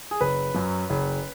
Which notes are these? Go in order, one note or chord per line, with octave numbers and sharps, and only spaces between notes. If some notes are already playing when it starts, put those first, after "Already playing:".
G#4
F#1 B4
F#2 F#3
F#1